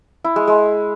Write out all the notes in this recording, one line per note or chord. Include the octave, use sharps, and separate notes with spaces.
E4
G#3
G#3